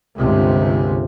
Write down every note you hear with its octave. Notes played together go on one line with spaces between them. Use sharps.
G1 C#2 C3